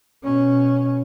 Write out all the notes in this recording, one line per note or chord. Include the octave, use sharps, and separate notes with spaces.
B2 C#4